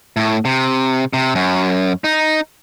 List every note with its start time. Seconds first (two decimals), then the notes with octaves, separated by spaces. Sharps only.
0.17 A2
0.45 C3
1.13 C3
1.35 F#2
2.04 D#4